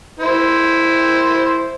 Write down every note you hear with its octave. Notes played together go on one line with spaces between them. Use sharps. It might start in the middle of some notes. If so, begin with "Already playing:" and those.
E4 C5